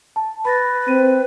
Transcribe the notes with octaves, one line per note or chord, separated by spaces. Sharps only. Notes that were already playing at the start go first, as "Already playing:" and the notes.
A5
B4 B5 A6 A#6
C4 D#7